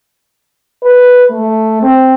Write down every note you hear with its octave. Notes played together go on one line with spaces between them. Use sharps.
B4
A3
C4